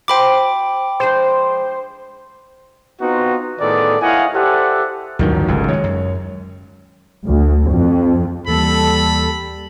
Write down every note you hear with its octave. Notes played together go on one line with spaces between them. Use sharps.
F#4 C5 G5 B5 D6
F3 G#3 D4 C5
B3 C4 D#4 F4 F#4
A2 D#3 B3 G#4 A4 D5
E4 C#5 D#5 F5 F#5 G#5
G4 A4 C5 D5 E5 F#5
A1 D2 G2 D#3 F3 F#3
G1 C#2 G#2
D#3 G#3 C#5
F#2
D2
F2
D#2 E3 G3 A#3 A4 B5